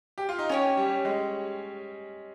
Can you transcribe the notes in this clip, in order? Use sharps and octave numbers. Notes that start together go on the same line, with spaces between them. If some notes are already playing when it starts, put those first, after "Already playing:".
G4
F4
D#4
C#4 G4 C#5 G#5
G3
G#3